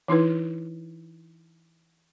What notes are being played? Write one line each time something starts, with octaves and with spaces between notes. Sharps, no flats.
E3 D#4 E4 B4